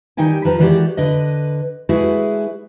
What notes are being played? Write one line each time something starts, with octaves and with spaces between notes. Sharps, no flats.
D#3 G3 D#4 G5 G#5
F2 F3 B4 A5 A#5
D#3 E3 G#3 F#4 G4 D5
D3 B4 D#5
G#3 A3 E4 F#4 G#4 B4